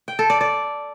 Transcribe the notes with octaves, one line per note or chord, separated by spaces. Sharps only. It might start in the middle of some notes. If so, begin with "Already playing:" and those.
G5
A4
D5
D5